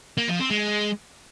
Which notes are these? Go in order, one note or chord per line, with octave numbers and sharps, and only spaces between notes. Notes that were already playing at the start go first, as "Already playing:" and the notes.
A#3
F3
C4
G#3